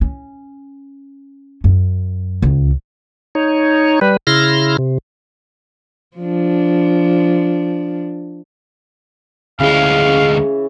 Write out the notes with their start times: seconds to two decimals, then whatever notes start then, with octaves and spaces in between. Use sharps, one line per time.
0.01 C#4
1.64 F#2
2.42 C#2
3.35 D#4 C#5
4.01 G3 B4
4.27 C#3 E4 C6 F6 A#6
4.78 C3
6.17 F3 D4
9.60 D2 C#3 E3 G#3 C#5 F5